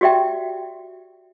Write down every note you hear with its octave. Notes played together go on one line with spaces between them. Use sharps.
F#4 G4 D5 E5 G5